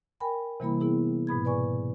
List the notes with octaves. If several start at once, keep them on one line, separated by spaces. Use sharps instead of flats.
A#4 G5 G#5 B5
C3 E3 G3 A#3 E4 B5
B3 E4 G#4
G#2 B2 B5 G#6
B4 D5 G#5 C#6